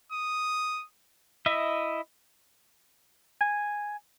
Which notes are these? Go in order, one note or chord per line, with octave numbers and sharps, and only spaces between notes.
D#6
E4 D#5 E5
G#5